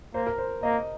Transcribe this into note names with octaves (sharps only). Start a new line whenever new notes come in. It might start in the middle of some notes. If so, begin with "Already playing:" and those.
A#3 C5
A#4
C5
A#3 D#5